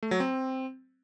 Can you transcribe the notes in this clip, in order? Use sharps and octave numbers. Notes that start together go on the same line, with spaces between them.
A3
F#3
C4